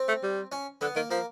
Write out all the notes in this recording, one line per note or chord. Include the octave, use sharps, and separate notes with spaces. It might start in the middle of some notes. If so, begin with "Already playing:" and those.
Already playing: C4
A3
G3
C#4
D3 B3
D#3 A#3
F3 A#3